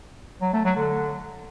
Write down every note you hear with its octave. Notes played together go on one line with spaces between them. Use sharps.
F#3
A3
F#3
D3